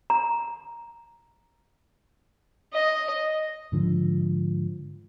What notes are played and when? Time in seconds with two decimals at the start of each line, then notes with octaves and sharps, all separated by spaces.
0.10 A#5
2.73 D#5
3.72 G#2 D3 F3